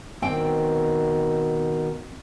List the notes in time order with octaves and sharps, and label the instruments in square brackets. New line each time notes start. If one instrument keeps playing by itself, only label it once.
[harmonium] B2 D#3 [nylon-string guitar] C4 D5 G5